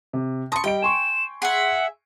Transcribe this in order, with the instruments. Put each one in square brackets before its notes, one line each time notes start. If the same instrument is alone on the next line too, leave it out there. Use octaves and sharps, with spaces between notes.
[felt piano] C3
[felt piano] A5 C6 D#6 [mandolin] A#5 C#6
[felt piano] G3 D#5 D7 [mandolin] G5
[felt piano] G#5 C6 C#6 [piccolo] E7
[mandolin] G#4 E5 [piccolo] F#5